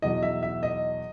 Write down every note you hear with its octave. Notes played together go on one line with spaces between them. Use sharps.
E2 B2 F#3 D#5
E5
E5
D#5